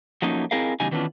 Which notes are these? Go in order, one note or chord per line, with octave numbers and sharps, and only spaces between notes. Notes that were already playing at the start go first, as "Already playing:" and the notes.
F3 F#3 A3 A#3 C#4 D#4
C4 E4 G#4 A#4 D#5 F5
E2 C#3 G3 D#4 G#5
D#3 E3 B3 C#4 D4 F4